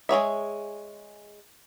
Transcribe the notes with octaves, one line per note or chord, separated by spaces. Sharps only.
G#3 G#4 C#5 E5